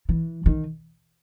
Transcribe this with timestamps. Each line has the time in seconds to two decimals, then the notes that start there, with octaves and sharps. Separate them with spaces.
0.09 E3
0.46 D#3